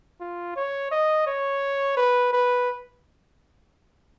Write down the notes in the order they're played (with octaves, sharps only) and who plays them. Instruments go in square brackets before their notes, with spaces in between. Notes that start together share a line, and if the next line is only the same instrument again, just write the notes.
[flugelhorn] F4
C#5
D#5
C#5
B4
B4